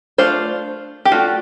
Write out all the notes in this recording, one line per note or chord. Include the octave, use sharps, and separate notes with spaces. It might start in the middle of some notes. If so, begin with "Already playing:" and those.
A3 D4 F4 C5
G4
A3 D4 F4 F#4